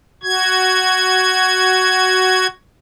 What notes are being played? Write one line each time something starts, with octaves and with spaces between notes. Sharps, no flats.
F#4 G#6